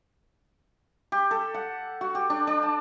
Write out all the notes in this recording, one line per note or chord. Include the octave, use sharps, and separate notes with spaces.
G4
A4
F#5
F#4
G4
D4
D4
A5